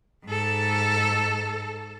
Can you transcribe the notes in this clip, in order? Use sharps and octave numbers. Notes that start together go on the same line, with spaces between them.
G#2 A4